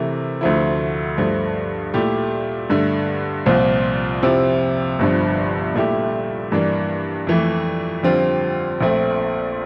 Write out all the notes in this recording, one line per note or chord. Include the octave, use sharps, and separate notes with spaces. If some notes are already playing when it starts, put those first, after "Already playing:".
Already playing: C3 E3 A3 E4 A#4
D2 D3 F3 A3 E4
G2 F3 A3
A#2 A3 E4 G4
G2 D3 A3
C2 A#2 F3 C4
F2 C3 F3 C4 E4
G1 G2 D3 F3
A#2 A3 E4 G4
G2 E3 A#3 D4
F2 E3 A3
F2 D3 G3 C4 F4
A#1 A#2 A3 C4